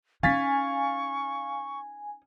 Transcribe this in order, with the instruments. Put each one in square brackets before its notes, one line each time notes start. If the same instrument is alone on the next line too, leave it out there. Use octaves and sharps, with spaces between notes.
[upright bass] C#4 D#4 [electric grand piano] F5 A6 B6 [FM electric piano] G#5 [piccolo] C#6